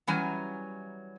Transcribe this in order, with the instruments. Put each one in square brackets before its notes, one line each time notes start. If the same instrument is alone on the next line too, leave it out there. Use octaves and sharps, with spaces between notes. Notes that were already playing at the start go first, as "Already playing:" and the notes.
[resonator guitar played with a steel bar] E3 F#3 G3 C#4 G#5 A#5